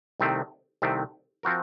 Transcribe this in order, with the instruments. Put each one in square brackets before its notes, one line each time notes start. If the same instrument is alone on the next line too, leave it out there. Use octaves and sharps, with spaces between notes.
[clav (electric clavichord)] C2 C3 D#3 A3 C4
C2 C3 D#3 A3 C4
F3 C4 F#4 A#4